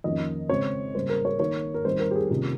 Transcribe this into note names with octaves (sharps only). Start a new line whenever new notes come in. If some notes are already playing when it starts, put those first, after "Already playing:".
F2 D#3 A#3 C#4 D#5
C#3 G#3 C4 C#5
C#3 G3 A#3 C5
A#4
C#5
D#3 A#3 D#4 C#5
A#4
D#3 G3 C4 D#4 C5
A#4
G4
G#4
C3 D#3 A#3 C#4 F4